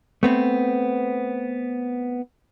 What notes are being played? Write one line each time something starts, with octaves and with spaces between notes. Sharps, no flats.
A3 B3 C4